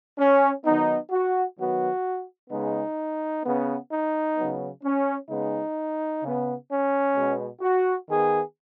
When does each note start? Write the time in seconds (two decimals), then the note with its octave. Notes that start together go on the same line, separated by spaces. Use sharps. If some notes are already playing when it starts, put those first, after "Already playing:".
0.18 C#4
0.65 D#3 F#3 B3 D#4
1.11 F#4
1.57 D#3 F#3 B3 F#4
2.50 C#3 G#3 B3 D#4
3.44 C#3 B3
3.90 D#4
4.36 C#3 F#3 B3
4.83 C#4
5.29 C#3 G#3 B3 D#4
6.22 C#3 B3
6.69 C#4
7.16 B2 G#3 B3
7.61 F#4
8.08 D#3 B3 G#4